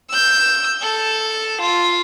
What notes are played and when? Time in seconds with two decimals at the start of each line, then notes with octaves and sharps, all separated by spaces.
0.10 E6 G6
0.82 A4
1.62 F4